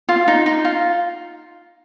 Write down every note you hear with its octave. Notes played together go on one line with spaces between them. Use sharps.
F4
D#4
D#4
F4